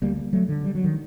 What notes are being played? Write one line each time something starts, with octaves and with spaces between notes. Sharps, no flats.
D2 G3 A#3
F#3 A3
D3
G3
F#3
D#3